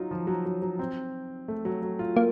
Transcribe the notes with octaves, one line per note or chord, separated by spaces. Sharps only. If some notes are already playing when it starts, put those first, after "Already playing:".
Already playing: F#3 D#4 F4
F3
F#3
F#3
F#3
C4
A3
F#3
F#3
F4
A#3